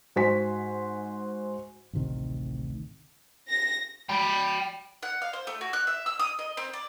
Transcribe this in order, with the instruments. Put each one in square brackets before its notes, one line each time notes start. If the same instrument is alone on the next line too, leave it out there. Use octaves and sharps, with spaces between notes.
[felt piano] G#2 F#4 C5 G#5 B6
[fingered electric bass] A1 D2 C3 D#3
[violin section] A#6
[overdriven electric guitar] G5 B5
[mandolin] F#5
F5
C5
A3
F#4
F#6
E5
E6
D#6
D#5
C4
D5